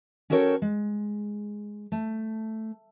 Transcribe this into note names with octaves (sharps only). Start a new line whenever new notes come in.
C#4 F#4 A4 A#4 C#5 G5
G#3
A3